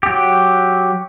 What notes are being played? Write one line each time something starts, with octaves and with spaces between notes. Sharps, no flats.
F#3 G4